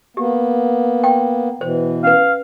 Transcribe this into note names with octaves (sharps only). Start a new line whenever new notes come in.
A#3 B3 G4
G5
B2 E3 C5
C#4 B4 F5